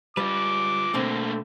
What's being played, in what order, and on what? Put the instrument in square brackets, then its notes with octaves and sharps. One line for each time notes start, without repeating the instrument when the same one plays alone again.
[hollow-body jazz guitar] G3 [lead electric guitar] F4 B4 [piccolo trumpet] D6
[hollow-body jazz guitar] B2 D3 C4 [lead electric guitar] A3 A#3